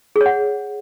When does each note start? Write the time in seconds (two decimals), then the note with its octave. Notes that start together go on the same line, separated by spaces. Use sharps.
0.16 G#4
0.21 C#5
0.26 F#5